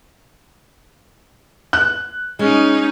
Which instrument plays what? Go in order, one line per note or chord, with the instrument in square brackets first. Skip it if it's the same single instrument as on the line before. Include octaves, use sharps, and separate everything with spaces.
[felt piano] F#6
[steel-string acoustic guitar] G#3 [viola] C#4 D#4